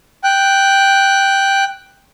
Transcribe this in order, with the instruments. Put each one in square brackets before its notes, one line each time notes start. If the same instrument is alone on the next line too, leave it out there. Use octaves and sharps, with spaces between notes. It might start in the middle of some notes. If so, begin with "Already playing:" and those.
[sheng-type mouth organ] G5 F#6